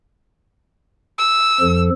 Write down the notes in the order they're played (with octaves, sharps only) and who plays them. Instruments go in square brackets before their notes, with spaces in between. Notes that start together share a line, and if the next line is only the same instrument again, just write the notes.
[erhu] E6
[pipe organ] F2 F3 A4